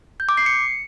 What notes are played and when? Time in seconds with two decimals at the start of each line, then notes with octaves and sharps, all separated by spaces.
0.20 G6
0.29 D6
0.37 C7
0.46 C#7